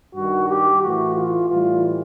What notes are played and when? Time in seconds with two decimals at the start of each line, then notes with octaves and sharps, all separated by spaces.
0.15 G2 D#3 G3 F#4
0.49 G4
0.82 A2 E3 A3 F#4
1.15 F4
1.49 A2 E3 G3 F4